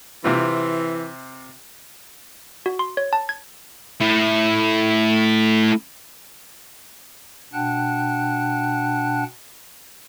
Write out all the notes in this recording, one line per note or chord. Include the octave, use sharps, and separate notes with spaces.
C3 E3 C4 F4
F#4
C6
C#5
A5
G#6
A3 E4
B2 D4 F#5 G5 A5 F#6